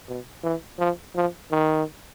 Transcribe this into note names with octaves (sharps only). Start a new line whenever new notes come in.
B2
E3
F3
F3
D#3